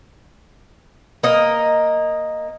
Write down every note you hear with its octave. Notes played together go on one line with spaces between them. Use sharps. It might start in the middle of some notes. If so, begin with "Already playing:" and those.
A#3 D#5